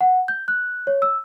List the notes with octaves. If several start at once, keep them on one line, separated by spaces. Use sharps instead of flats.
F#5
G6
F#6
C#5
E6